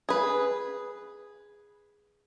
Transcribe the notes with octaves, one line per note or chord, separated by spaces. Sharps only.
G#4 B4